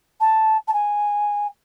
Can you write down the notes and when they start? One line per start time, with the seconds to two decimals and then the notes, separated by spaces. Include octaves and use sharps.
0.21 A5
0.68 A5
0.74 G#5